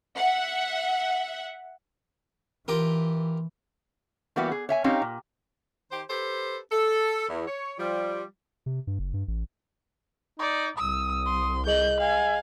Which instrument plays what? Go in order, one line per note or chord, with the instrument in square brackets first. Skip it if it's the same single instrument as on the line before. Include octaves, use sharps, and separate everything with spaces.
[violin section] E5 F#5
[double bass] E3 [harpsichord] F4 G4 A#4
[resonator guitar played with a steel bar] E3 G3 A#3 B3 F#4 G4
G#4
C#5 E5 G#5
C4 C#4 D#4 G4 C#5 F5
A#2
[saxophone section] D#3 G4 C5
G4 A4 B4 C5
A4
E2
C#5
F3 G3
[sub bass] C3
G2
F#1
G2
A1
[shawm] D#4 [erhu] D5
[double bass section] C2 [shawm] D#6 [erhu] E6
[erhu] C6
[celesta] G#4 D#5 F#7 [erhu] G6
[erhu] F5 [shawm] G#5